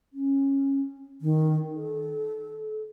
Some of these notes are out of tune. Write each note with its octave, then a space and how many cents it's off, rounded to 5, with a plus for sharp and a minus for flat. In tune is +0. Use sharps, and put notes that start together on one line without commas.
C#4 -15
D#3 +0
A4 -30